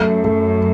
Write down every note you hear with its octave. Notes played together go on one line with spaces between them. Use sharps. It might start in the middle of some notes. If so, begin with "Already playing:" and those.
Already playing: F#2 A3
A3